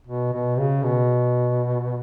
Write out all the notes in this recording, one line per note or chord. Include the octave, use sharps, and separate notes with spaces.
B2
B2
C#3
B2